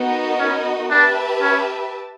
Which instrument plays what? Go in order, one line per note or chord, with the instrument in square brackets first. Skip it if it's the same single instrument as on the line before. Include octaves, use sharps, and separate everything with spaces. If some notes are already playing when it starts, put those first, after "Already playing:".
Already playing: [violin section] B3 D#4 F#4 A#4 D#5
[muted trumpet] C#4
[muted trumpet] D4 [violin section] G4 B4 E5 A5
[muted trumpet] C#4